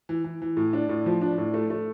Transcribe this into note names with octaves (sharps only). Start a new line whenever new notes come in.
E3
E3
E3
A2
D4
A2
F3
D4
A2
A3
A3